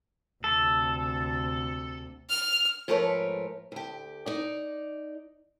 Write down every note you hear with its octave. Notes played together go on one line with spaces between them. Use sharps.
D2 C3 A4
F6
G#2 F3 A3 A#4 B4 C#5
D2 G4
D#4 D5